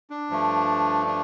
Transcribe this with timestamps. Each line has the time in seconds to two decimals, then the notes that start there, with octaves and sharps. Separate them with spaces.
0.10 D4
0.30 G2 F3 A3
1.07 D4